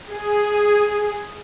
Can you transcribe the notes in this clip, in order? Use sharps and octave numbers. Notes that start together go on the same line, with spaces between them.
G#4